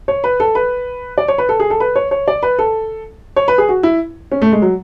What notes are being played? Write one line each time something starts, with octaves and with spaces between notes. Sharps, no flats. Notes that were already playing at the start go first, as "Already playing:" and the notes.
C#5
B4
A4
B4
D5
C#5
B4
A4
G#4
A4
B4
C#5
C#5
D5
B4
A4
C#5
B4
G#4
F#4
E4
C#4
A3
G#3
F#3